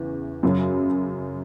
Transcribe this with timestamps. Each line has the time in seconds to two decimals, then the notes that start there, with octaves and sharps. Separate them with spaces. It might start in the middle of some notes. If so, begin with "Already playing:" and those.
Already playing: E2 C#3 E3
0.43 F#2 C#3 F#3